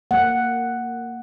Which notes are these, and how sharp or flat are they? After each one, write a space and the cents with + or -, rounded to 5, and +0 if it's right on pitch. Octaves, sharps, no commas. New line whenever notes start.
A#3 -10 F#5 +0